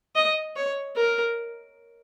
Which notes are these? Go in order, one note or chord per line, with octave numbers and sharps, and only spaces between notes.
D#5
C#5
A#4